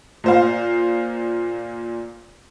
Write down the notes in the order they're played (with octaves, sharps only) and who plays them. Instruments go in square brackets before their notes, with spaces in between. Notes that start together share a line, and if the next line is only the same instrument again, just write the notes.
[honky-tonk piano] A#2 C5 F5